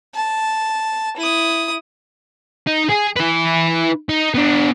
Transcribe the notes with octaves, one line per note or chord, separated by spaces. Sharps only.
A5
E4 D#6
D#4
G#4
E4 B4
D#4
B3 D4